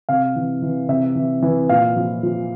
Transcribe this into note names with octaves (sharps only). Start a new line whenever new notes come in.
C3 F5
E3
E3
C3 E5
E3
E3
A#2 F5
F3
F3